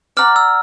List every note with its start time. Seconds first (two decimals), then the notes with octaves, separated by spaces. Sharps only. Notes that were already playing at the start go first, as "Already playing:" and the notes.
0.17 D5 F#5 A#5 F6
0.36 E6